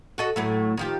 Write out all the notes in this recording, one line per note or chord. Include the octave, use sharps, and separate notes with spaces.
F#4 A4 D#5
A2 F#3 A3
D#3 F3 G4